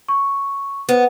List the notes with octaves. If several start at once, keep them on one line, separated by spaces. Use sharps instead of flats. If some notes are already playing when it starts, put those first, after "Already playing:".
C#6
B3 C5